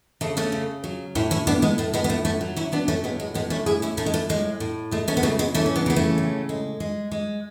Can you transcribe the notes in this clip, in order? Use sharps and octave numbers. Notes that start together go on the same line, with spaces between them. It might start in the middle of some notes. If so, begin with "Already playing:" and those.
C#3 A3
A3 C#4
C#3
F#3
A2 C#4 E4
C#4 E4
A2 B3 D4
G#3 B3
A2 A3
G#3 B3
B3
A2 A3
A3 C#4
F#3
C#4 E4
F#3 B3 D4
A3 C#4
A2 G#3 B3
G#3
A2 G#3 B3
A3 C#4
A2 E4 G#4
C#4 E4
A2 A3 C#4
G#3
A3
A2 G#3
A2
G#3 A3
A3 C#4
B3
C#3 A3 C#4
G#3 B3
E3 A3 C#4
C#4
B3 D4
C#3 B3
A3 C#4
A2
G#3
G#3
G#3